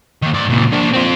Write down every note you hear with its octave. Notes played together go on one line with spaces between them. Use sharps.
D#3 A#3
G#2 D5
C#2 A#2
A#3 D4
C4 F4